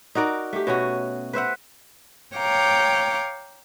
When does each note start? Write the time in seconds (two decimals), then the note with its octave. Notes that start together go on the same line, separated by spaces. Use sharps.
0.15 D#4 F#4 A#4 D5
0.53 A3 G4
0.67 B2 C#4 F#4
1.33 B4 C5 E5 F#5
2.36 C#5 F5 G5 A#5 D6